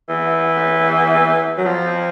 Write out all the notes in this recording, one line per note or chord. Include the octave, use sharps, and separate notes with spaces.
E3
F#3
F3